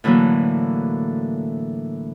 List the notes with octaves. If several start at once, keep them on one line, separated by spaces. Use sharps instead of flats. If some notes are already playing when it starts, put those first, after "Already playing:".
A2 D3 E3 F#3 A#3